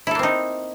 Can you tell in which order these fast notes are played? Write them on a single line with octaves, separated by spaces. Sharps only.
E4 A4 A#3 C4 D#4